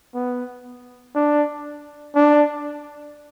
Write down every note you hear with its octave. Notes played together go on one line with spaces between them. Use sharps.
B3
D4
D4